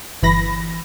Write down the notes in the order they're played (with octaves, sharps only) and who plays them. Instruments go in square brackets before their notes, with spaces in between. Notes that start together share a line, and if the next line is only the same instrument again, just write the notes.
[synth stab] G1 E3 B5 A#6